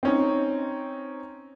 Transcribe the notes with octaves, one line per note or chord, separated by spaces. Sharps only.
C4 C#4 D#4